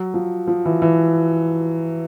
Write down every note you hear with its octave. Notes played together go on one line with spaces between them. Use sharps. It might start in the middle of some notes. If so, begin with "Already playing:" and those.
Already playing: F#3
F3
F3
E3
E3